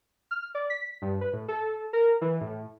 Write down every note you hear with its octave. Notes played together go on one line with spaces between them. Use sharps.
F6
D5
B6
G2
B4
A2
A4
A#4
E3
A2